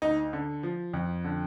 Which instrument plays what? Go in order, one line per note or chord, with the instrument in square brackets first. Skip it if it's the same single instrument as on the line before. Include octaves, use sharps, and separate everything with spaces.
[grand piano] D2 D#4
D3
F3
F2
D3